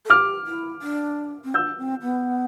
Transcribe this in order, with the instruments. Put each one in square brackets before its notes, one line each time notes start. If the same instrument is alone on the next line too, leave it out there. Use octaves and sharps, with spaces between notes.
[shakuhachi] A4
[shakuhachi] G4 [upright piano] D6 F6
[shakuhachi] E4
D4
C4
[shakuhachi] D4 [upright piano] E6 G6
[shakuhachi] C4
B3